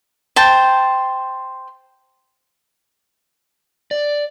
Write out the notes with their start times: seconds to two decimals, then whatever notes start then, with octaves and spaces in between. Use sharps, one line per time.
0.36 C5 G5 A5
3.91 D5